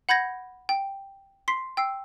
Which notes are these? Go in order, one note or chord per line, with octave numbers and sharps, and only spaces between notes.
F#5 B5 G6 G#6 A#6
G5
C6 B6 C7
G5 E6 C7